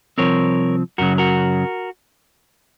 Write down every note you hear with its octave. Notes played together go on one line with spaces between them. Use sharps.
C2 C3 F3 C4 A#4 C#5
F#2 C#3 F#3 F#4 A#4
F#4 A#4